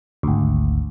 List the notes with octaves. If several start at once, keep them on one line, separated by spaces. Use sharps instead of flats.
G#1 D2